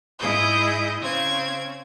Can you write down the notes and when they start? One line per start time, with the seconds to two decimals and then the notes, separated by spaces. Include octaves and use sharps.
0.19 G#2 E4 G#4 D#5 G6
1.00 C#3 C4 G#6